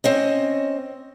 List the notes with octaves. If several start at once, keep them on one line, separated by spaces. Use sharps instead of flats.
C4 C#4 D#5